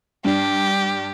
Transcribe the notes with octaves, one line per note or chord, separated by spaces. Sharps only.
G2 D4 G4